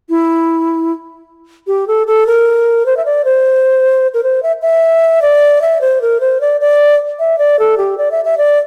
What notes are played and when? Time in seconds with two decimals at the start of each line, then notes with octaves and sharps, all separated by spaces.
0.09 E4
1.67 G4
1.87 A4
2.07 A4
2.27 A#4
2.86 C5
2.97 E5
3.06 D5
3.25 C5
4.14 A#4
4.23 C5
4.43 E5
4.62 E5
5.22 D5
5.62 E5
5.81 C5
6.02 A#4
6.20 C5
6.41 D5
6.61 D5
7.19 E5
7.38 D5
7.59 A4
7.78 G4
7.98 D5
8.11 E5
8.25 E5
8.38 D5